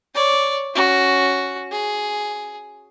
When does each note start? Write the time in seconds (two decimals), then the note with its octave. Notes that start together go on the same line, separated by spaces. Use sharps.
0.15 C#5 D5
0.75 C#4 F#4
1.72 G#4